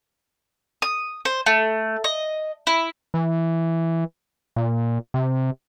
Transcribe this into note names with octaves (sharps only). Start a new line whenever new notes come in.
D#6
C5
A3
D#5
E4
E3
A#2
C3